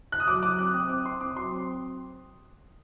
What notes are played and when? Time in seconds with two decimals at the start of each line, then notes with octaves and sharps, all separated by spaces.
0.12 F#6
0.20 D#6
0.27 F#3 D6
0.43 F#3 D6
0.58 C4 F#6
0.74 C4 D#6
0.89 C4 D6
1.05 C4 C6
1.21 C4 D6
1.36 F#3 C6
1.52 C4